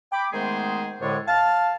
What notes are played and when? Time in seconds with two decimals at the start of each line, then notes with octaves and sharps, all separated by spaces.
0.12 G5 B5 D6
0.33 D#3 G#3 A3 B3 G#4 C5
1.01 C2 A2 D3 G#3 D4 C#5
1.28 F5 A5